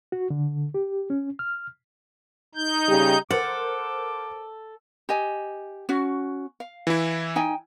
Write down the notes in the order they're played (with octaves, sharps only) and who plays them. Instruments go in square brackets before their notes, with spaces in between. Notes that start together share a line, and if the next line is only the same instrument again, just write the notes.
[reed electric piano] F#4
D3
G4
C#4
F6
[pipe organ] D#4 G6
[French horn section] C#3 G3 G4
[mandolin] A4 [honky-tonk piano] A#4 C5 [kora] F#5 [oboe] D6
[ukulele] G4 D#5 G#5
C#4 F#4
F5
[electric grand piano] E3 E4
[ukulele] D#4 G5 G#5